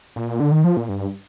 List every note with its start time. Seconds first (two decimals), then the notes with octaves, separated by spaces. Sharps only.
0.16 A#2
0.40 D3
0.52 D#3
0.64 F3
0.77 A#2
0.89 G2